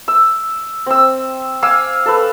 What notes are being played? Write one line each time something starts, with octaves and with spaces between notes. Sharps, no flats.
E6
C4 E6
F5 G#5 D6 E6
A4 B4